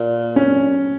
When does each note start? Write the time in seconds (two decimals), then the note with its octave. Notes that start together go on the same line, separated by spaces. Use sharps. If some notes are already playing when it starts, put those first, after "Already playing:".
Already playing: A#2
0.36 C#4